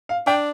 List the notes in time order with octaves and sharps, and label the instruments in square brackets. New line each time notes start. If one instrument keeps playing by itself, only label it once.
[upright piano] F5
[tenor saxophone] D4 [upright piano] G5